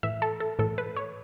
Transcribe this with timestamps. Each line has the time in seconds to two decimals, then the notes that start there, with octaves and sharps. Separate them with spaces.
0.03 A2 E3 E5
0.22 A4
0.40 A4
0.59 A2 E3 A4
0.78 B4
0.96 C#5